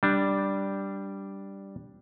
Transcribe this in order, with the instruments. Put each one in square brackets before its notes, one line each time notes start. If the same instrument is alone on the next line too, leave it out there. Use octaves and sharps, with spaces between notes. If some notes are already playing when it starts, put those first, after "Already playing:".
[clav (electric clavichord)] G3 D4